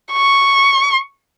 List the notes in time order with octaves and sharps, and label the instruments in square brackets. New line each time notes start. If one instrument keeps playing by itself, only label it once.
[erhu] C#6